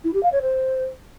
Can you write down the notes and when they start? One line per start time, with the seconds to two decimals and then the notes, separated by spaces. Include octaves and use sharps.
0.04 E4
0.13 G4
0.23 F5
0.32 C#5
0.41 C5